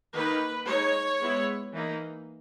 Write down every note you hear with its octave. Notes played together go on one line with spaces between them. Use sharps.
D#3 A#3 D#4 B4
G#3 D#4 C#5
G#3 B3 E4
E3 A#3 D#4